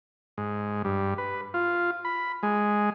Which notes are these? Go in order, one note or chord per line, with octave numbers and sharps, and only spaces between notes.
G#2
G2
B4
F4
B5
G#3